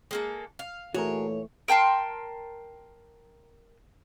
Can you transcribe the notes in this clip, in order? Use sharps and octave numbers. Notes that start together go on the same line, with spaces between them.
G#3 A#3 A4
F5
A#2 E3 A3 F#4 G#4 A#4 C#5
A#4 G5 A5 C6